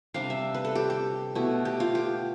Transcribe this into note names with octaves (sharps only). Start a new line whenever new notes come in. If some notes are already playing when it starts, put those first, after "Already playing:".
C3 G3 D4 F5
E5
B4
A4
G4
G4
B2 A3 E4
G4
F4
G4